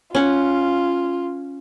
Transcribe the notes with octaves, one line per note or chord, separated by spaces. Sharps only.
C#4 F4 F#5